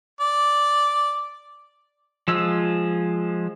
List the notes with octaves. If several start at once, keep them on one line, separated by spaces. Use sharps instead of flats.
D5
F3 G#3 E6